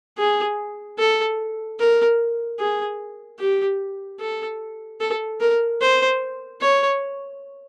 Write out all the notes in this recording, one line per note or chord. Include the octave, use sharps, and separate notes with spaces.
G#4
A4
A#4
G#4
G4
A4
A4
A#4
C5
C#5